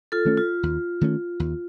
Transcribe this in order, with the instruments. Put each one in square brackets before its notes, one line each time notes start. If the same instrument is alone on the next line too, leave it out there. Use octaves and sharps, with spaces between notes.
[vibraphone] F4 A4
[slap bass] D#3 A3 C#4
[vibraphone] F4
[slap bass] D#2
D#3 A3 C#4
D#2